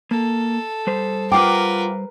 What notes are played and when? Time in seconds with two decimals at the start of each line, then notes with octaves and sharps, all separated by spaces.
0.11 A#3 A4
0.87 G3 C5
1.32 F4 A#4 B4 F#5 G5 A#5 D6